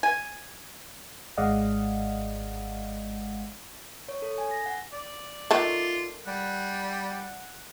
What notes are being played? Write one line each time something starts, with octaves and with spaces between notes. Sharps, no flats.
G#5
G#1 G#3 D5 D#5 F5 F#5
C#5
A4
G#5
A#6
F#5
D5
D#3 A3 D4 F4
G3 F#5